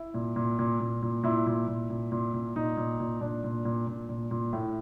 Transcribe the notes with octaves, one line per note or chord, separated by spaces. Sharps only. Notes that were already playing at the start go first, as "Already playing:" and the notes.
Already playing: E4
A#2
A#2
A#2
A#2
A#2
A#2 E4
A#2
A#2
A#2
A#2
A#2
A#2 D#4
A#2
A#2
A#2 D4
A#2
A#2
A#2
A#2
A#2
A2